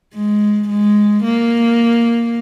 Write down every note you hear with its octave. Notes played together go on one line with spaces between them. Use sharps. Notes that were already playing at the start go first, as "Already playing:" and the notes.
G#3
G#3
A#3